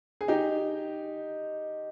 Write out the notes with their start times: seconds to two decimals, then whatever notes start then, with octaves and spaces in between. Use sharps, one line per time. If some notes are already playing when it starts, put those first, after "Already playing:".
0.21 G#4
0.28 D#4 G4